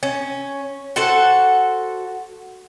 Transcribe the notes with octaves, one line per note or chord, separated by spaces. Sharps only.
C#4
F#4 A4 C5 F#5